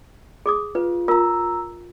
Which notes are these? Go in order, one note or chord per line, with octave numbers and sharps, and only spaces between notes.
G#4 D6 D#6
F4 B4
F4 A#4 A#5 E6